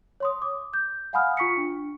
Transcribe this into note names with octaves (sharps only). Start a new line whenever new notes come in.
C#5 C6 D#6
D6
G6
F5 F#5 G#5 B5 D#6 F6
F4 C#6 B6 C#7
D4